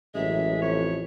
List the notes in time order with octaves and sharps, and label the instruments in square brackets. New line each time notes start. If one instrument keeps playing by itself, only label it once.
[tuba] A1 [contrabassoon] F#2 [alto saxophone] G#3 [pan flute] E5
[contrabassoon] F2 [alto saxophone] C#5